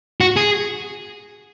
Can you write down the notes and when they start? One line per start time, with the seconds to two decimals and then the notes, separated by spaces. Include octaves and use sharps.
0.21 F#4
0.36 G#4